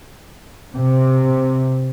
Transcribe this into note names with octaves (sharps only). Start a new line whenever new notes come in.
C3